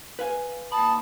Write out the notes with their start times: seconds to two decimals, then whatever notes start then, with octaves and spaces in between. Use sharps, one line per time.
0.19 B4 F5 G#5
0.72 D#2 A5 B5 D#6